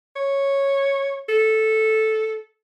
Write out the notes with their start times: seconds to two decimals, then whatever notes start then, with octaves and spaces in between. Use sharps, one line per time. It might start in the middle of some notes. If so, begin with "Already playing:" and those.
0.16 C#5
1.29 A4